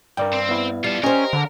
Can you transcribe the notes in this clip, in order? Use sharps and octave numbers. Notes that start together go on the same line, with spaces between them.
G2 A#4 D5 G5
C4
B3 E4
G3 F4 A4
C#4 G4 A#4 C5 D#5
D3